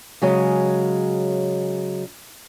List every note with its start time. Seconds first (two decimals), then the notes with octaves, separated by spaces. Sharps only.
0.22 C#3 F#3 G#3 C#4